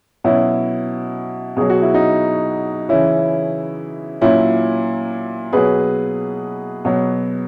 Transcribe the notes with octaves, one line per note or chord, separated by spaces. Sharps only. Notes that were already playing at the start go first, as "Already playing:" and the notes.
B2 F#3 C#4 E4
B2 F#3 G#4
F#4
E4
D#4 F#4
C#3 E3 C#4 E4
A#2 F#3 C#4 E4
B2 F#3 G#4 B4
B2 F#3